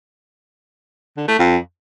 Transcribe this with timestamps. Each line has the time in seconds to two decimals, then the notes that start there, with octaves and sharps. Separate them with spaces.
1.17 D3
1.28 A3
1.39 F2